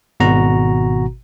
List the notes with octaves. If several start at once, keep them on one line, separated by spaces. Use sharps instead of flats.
G#1 B2 F#4 A#5